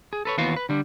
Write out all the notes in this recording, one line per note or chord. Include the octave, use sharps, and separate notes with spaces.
G#4
A4 B4 C#5
D#2 E3 B3 F4 F#4 F5
B4
D3 G3 D4